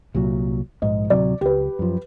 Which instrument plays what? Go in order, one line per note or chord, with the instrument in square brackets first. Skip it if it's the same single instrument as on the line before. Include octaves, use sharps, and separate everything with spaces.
[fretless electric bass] C2 A#2 F#3
[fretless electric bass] A#1 G#2 [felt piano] D#5
[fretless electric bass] D1 C3 F#3 [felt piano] D5
[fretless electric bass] C#2 [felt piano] G4 B4
[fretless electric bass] F#2 F3